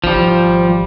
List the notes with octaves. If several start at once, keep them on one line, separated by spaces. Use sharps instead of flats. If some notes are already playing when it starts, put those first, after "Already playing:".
G#1 F3 G3